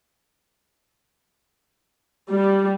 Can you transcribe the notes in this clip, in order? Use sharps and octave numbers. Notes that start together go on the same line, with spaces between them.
G3